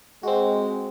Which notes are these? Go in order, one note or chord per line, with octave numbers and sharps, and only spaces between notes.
G#3 C4 F#4